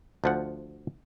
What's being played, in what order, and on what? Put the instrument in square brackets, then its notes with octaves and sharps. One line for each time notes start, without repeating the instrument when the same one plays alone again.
[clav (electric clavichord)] D2 F3 F#5